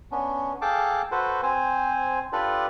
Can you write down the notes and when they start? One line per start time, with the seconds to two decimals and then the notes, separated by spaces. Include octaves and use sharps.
0.12 B3 C#4 D4
0.61 G#4 A4 F5 G5 A5 D6
1.11 F#4 A4 B4 C5
1.43 C4 C5 G#5
2.33 D4 F4 G4 A4 B4 D5